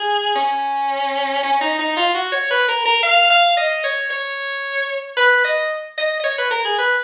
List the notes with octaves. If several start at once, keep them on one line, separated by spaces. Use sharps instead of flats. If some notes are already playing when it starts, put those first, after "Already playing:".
Already playing: G#4
C#4
C#4
D#4
D#4
F4
F#4
C#5
B4
A#4
A#4
F5
F5
D#5
C#5
C#5
B4
D#5
D#5
D#5
C#5
B4
A#4
G#4
B4